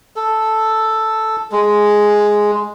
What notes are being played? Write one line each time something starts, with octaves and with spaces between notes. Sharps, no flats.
A4
G#3